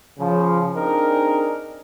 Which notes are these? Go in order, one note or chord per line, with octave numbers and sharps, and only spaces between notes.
C#3 F3
C4 D4 D#4 G#4 A#4